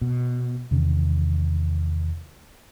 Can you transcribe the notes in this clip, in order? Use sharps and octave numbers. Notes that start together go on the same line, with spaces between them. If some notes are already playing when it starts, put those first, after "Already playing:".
B2
E2 C3 D#3 C#4